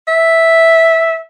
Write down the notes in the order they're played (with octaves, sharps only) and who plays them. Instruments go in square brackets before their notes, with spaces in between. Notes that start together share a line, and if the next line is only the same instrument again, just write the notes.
[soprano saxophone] E5